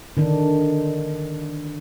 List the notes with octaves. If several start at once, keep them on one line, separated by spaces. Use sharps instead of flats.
D3 D#3 D4